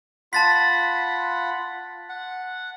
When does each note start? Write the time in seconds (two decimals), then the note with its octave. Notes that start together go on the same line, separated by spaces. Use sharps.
0.33 F4 F#5 A5 B5 A6 B6
2.09 F#5